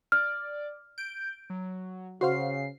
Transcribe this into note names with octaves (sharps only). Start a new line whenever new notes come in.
D5 F6
G6 D7
F#3
C#3 F#4 C5 F5 C7